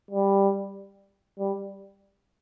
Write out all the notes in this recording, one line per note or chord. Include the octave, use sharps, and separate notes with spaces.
G3
G3